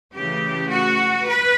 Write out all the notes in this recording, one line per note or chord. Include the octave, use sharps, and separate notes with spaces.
C#3 E3 A3 G4
F#4
B4